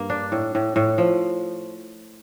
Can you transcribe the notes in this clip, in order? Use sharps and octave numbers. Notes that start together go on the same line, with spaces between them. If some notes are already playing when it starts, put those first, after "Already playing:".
Already playing: G2 A#3
D4
A2
A2
A2
F3